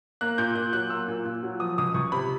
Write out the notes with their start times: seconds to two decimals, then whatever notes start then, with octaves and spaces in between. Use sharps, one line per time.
0.21 A#3 F#6
0.38 A#2 G6
0.55 A#2 F#6
0.73 F#3 F#6
0.90 A#3 E6
1.08 A#2
1.25 A#2
1.43 F#3
1.60 F3 D#6
1.78 C#2 D#6
1.94 C#2 C#6
2.12 C3 B5